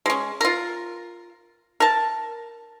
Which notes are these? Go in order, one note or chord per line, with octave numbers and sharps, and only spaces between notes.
G#3 C#4
F4 A#4
A#4 A5